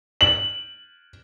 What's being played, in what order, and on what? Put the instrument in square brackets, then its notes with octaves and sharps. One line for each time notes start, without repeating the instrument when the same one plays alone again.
[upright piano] F#7